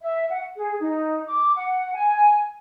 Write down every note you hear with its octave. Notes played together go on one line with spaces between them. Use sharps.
E5
F#5
G#4
D#4
D6
F#5
G#5